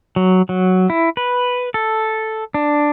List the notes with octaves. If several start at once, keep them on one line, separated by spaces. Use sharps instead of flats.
F#3
F#3
E4
B4
A4
D4